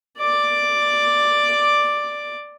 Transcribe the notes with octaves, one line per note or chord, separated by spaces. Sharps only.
D5 D6